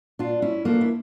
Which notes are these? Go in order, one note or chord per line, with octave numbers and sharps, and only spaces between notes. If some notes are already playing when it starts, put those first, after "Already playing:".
A#2 D4 F4
C#4 E4
F3 A3 A#3 D4
E4